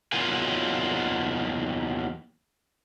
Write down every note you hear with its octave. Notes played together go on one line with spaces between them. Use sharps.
E2 D#3 F#3 A#3 F4 G#5